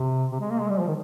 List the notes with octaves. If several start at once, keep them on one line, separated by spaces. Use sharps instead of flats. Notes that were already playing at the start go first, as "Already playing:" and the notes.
Already playing: C3
C3
G#3
A#3
G#3
G3
F3
D#3